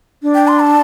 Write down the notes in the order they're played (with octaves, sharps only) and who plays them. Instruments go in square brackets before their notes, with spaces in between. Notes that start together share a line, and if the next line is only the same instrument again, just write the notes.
[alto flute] D4
[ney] G5
C6
A5